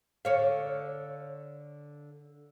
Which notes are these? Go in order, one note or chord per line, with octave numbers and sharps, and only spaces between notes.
D3 C#5 F5